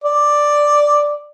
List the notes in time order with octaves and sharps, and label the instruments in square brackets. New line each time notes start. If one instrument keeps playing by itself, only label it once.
[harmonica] D5